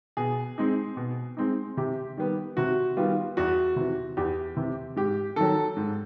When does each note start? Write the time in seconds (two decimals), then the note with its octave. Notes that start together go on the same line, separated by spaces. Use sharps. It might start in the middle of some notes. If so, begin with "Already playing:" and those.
0.17 B2 G#4
0.58 G#3 C4 D#4
0.97 B2
1.37 G#3 C4 D#4
1.77 C3 G4
2.17 D#3 G3 B3
2.57 C3 F#4
2.97 D#3 G3 B3 F4
3.37 E2 F#4
3.76 C3 E3
4.17 E2 G4
4.57 C3 E3
4.96 G#2 G4
5.36 D#3 F#3 A4
5.77 G#2